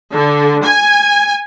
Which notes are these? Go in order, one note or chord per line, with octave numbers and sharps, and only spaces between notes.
D3
G#5